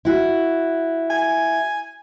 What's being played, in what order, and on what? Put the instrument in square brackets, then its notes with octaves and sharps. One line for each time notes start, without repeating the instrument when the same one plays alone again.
[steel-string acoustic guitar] E4 F#4
[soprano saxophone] G#5